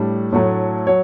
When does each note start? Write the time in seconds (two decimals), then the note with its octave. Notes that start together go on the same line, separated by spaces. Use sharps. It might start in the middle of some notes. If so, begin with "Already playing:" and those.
Already playing: A2 G3 D4
0.33 A2 F#3 A3
0.87 F#3 C#5